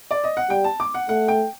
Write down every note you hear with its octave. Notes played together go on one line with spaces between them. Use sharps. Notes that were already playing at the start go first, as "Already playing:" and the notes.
D5
D#5
F#5
G3 G5
A5
D6
F#5
A3 F#5
G5